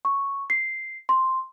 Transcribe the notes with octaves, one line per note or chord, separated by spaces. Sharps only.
C#6
C7
C6